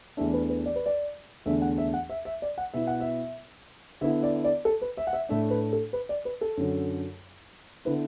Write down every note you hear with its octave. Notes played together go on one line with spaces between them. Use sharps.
E2 E3 A3 D4 E5
B4
B4
D5
B4
D5
E2 D3 A3 D4 E5
F#5
E5
F#5
E5
E5
D5
F#5
B2 B3 E4 E5
F#5
E5
D3 B3 E4 E5
D5
D5
A4
B4
E5
F#5
E5
A2 A3 D4 E5
B4
A4
B4
D5
B4
A4
F#2 D3 F#3
D3 B3 E4 B4